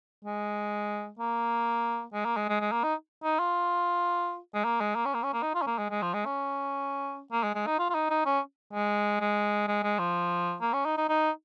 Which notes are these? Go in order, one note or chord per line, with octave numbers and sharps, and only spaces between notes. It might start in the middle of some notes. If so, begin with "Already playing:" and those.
G#3
A#3
G#3
A#3
G#3
G#3
G#3
A#3
D#4
D#4
F4
G#3
A#3
G#3
A#3
C#4
A#3
C#4
A#3
D#4
F4
C#4
A#3
G#3
G#3
F3
G#3
C#4
A#3
G#3
G#3
D#4
F4
F4
D#4
D#4
C#4
G#3
G#3
G#3
G#3
F3
A#3
C#4
D#4
D#4
D#4